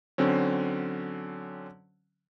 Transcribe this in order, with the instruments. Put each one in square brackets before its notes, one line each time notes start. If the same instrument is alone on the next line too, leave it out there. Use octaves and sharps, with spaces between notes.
[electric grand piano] D3 F#3 C4 C#4